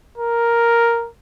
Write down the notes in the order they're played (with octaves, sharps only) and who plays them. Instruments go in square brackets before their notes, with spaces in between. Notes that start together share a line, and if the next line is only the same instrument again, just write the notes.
[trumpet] A#4